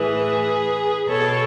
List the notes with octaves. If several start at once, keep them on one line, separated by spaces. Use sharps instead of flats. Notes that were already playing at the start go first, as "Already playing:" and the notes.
Already playing: A2 E3 G#4 B4
B2 A4 C#5